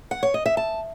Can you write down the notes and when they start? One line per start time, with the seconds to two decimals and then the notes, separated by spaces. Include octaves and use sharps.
0.11 F#5
0.23 C#5
0.34 D#5
0.46 E5
0.57 A5